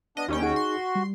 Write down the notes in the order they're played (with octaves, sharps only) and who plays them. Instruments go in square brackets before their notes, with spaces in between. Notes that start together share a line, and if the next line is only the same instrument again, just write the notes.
[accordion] B3 D4 [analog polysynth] D#5
[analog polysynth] D#2 C#4 G5 [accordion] D#3 G3
[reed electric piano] D#4 G#4 [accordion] F#4
[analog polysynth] C6
[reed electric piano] G3